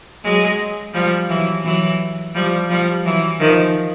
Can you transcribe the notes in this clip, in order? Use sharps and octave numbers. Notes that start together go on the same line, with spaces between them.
F#3 G#3
F3 G3
E3 F#3
E3 F#3
F3 G3
F3 G3
E3 F#3
D#3 F3